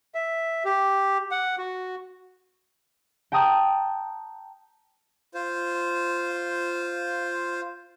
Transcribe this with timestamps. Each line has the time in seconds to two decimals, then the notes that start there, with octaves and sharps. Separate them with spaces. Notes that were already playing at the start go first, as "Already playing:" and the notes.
0.15 E5
0.65 G4
1.31 F#5
1.58 F#4
3.32 G5 A5 A#5 D#6 G6
5.34 F4 C5